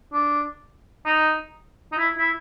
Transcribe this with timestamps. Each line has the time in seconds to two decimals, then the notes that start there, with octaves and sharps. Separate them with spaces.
0.13 D4
1.06 D#4
1.92 D#4
1.98 E4
2.19 E4